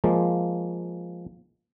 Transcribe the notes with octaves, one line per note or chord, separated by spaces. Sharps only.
F3 G#3 A#3